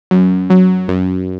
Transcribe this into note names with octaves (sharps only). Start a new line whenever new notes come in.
F#2
F#3
F#2